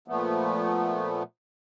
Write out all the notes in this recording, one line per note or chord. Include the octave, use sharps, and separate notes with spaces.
A#2 F3 A3 B3